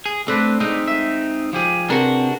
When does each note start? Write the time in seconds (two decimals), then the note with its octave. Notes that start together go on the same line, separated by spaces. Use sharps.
0.06 G#4
0.28 A3 C4 D4 B4
0.60 G#3 C4 D#4
0.88 E5
1.53 F3 G4 G#4
1.90 C3 D4 F#4 G#4 A#4 B4